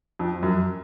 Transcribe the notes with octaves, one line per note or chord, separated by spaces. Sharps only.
F2
F#2